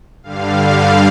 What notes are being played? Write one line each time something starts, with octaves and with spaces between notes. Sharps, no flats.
G2 D3 G3 F5